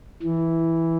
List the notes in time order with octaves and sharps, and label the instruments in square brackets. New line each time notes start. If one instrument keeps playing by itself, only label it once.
[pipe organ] E3